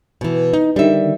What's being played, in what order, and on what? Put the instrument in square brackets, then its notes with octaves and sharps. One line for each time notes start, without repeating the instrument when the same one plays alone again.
[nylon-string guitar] B2 E3
D#4
[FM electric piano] D3 D#3 [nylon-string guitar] G3 E5